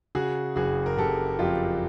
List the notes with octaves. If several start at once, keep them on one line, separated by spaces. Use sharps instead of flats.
C#3 F#4 G#4
F#1 F#4 G#4
A#4
F#1 G4 A4
F2 F4 G4